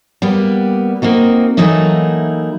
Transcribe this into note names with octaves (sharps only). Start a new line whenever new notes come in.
G3 A#3 B3 G4
A#3 C4 D#4 F#4
E3 F#3 A3 A#3 D#4 E4